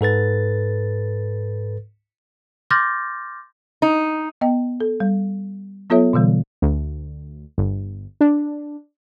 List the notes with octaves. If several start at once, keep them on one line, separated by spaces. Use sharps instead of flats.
G#2 A4 B4 A6
C6 D6 F6 G6 A6 A#6
D#4
B3 D#5 G5
A4
G3
F#3 B3 F4 A4 C#5 E5
B2 D3 E3 G3
D2
G1
D4